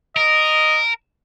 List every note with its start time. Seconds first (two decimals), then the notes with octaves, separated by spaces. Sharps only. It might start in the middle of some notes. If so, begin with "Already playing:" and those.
0.17 A#4 D#5